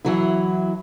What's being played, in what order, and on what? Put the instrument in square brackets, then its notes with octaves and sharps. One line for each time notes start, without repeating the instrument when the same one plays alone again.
[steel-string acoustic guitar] E3 F#3 E4